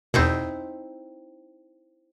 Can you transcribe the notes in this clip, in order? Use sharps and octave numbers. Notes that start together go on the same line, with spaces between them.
E2 B2 C4 D#4 E4